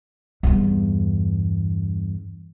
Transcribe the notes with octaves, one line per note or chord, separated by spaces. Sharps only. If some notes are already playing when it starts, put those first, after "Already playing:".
E2 G2